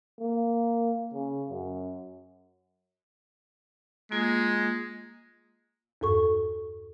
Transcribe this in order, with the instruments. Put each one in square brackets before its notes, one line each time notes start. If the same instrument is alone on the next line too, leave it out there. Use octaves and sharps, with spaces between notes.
[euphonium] A#3
C#3
F#2
[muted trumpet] G#3 [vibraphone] A#3 F4
[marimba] E2 G2 A4 C#6